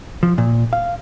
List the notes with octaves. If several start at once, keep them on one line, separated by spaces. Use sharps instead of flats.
F3
A#2
F5